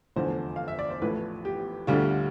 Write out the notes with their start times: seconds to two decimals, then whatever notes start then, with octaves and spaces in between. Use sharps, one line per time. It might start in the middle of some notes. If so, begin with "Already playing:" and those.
0.16 F1 E2 D3 F3 C5
0.56 F5
0.68 E5
0.79 D5
0.90 C5
1.02 A1 A2 F3 B4
1.45 G4
1.87 D2 D3 G3 F4